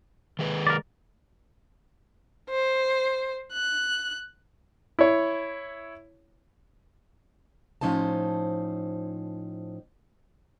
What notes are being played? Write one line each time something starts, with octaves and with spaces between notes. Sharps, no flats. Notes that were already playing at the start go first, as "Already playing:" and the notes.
D#3 G#3 B4
A#4 D5
C5
F#6
E4 C#5
A2 F3 C#4 D#4 C5 A5